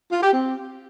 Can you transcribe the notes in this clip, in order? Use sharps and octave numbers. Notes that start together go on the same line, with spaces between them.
F4
G4
C4